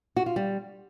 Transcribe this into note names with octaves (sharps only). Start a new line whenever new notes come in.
F#4
F4
G3